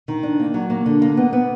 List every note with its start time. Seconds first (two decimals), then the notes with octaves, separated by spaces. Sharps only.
0.08 D#3
0.23 D4
0.40 A#3
0.54 F#3
0.70 A#3
0.86 D3
1.02 A#3
1.17 B3
1.33 B3